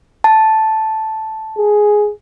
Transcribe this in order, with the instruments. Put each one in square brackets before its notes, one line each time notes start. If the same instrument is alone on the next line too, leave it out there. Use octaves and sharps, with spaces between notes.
[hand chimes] A5
[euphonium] G#4